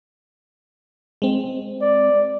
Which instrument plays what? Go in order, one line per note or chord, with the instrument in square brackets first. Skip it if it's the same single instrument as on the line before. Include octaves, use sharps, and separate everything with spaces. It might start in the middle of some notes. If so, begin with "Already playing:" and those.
[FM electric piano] G#3 C4
[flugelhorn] D5